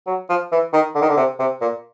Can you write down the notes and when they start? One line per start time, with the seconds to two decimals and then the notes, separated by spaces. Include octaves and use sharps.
0.07 F#3
0.29 F3
0.52 E3
0.73 D#3
0.95 D3
1.02 D#3
1.09 D3
1.17 C3
1.40 C3
1.61 A#2